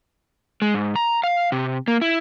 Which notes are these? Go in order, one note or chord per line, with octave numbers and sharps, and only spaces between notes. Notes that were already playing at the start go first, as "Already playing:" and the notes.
G#3
G#2
A#5
F5
C3
A#3
E4